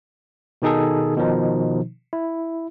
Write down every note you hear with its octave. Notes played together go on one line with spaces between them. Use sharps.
B2 D#3 D#4 G#4 A4
B2 D#3 F3 D#4
E4